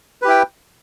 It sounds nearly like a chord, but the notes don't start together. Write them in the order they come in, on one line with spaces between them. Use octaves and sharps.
B4 G4 E4 G5